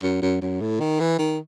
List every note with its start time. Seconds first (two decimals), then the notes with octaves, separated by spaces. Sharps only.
0.03 F#2
0.22 F#2
0.41 F#2
0.61 A2
0.80 D#3
1.00 E3
1.19 D#3